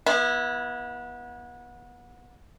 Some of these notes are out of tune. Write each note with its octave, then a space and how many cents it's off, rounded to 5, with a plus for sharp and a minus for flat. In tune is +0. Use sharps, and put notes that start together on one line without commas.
B3 -30 E4 +0